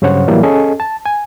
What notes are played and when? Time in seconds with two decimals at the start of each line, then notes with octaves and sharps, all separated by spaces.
0.02 G2 C#3 F#3 C5 C#5 F#5
0.28 A2 E3 F#3 G3 A#3
0.43 C#4 G#4 A4 D#5 G#5 A5
0.80 A5
1.06 G#5